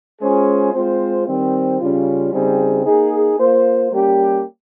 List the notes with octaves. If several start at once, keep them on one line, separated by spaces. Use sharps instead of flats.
G#3 C#4 F4 G#4 C5
G#3 C4 F4 C5
D#3 G3 C4
C#3 G3 C#4 F4
C#3 G3 C4 D#4 G#4
A#3 D#4 G#4
A#3 F4 C5
G3 A#3 C#4 G4